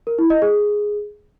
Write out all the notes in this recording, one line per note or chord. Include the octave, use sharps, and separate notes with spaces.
A#4
E4
D#5
G#4